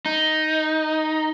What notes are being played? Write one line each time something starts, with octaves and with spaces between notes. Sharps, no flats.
D#4